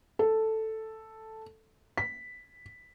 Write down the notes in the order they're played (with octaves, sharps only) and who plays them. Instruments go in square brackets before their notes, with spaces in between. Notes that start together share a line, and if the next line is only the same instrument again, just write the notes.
[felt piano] A4
B6